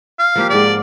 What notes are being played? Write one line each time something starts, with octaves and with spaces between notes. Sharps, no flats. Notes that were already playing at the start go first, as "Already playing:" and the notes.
F5
F3 A#3 G4
G#2 D4 D5